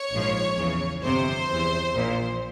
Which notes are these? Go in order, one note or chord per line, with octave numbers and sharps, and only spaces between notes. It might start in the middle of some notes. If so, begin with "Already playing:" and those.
Already playing: C#5
A#1 G#2 F3
E2 C#3 E3
G1 F2 C3 C5
E2 E3
A#1 A#2 F3